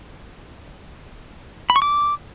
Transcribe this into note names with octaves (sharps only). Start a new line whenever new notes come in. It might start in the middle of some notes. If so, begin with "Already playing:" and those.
B5
C#6
D6